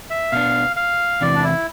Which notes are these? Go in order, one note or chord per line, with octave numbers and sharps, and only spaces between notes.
E5
B2 B3 D4 F5
F5
E2 C3 E3 D5
D4
E4